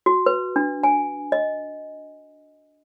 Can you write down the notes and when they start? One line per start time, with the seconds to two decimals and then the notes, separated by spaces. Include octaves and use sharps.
0.06 F#4
0.26 B4
0.56 D4
0.84 G#5
1.32 D#5